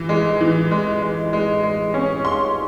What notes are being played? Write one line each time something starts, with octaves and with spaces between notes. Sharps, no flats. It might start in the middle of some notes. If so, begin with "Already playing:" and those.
Already playing: E3
G#3
E3
G#3
G#3
G#3
G#3
C#4
G#3 C6